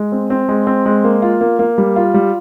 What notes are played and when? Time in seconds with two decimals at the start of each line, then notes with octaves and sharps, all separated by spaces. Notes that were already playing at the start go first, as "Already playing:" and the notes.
Already playing: G#3
0.12 C4
0.30 C4
0.49 G#3
0.67 C4
0.86 G#3
1.04 A#3
1.22 F4
1.41 A#3
1.59 A#3
1.78 G3
1.96 F4
2.14 G3